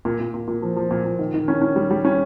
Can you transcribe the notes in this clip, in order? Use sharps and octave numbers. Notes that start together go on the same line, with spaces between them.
A#2
A#2
A#2
A#2
F3
F3
A#2
A#2
D#3
D#3
C#4
C#4
G3
G3
C#4